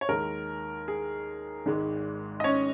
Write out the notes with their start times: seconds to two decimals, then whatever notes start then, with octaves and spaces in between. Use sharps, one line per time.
0.01 C#5
0.09 D#2 D#3 G#3 A#4
0.88 G#4
1.66 G#1 G#2 D#3 G#3
2.40 D#5
2.44 C#4 C#5